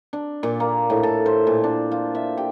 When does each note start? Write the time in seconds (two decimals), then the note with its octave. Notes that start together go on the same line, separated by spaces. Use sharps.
0.13 D4
0.43 A#2
0.60 A#3
0.90 A2
1.03 A4
1.26 C5
1.47 A#2
1.64 D4
1.91 F4
2.15 E5
2.37 G4